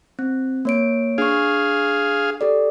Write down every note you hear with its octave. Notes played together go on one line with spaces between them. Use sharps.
C4
A#3 C#5 D7
D4 G#4 F5 C#6
G4 A4 D5